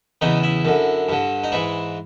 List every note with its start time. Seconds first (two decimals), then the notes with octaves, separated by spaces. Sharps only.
0.21 E2 C#3 E3 D#4
0.43 E4
0.65 F#2 D3
1.09 G2 D3
1.44 D#4
1.52 G#2 E3 E4